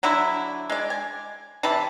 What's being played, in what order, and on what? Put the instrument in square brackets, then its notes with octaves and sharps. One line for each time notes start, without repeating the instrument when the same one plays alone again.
[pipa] D3 F#3 D4 E4
G#3 D5
G#5
C3 E3 A5 B5